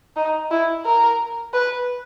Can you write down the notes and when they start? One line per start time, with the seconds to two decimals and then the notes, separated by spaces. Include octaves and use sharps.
0.16 D#4
0.51 E4
0.86 A#4
1.54 B4